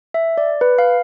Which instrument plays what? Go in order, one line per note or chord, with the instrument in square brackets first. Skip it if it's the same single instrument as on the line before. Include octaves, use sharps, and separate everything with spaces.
[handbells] E5
D5
B4
F5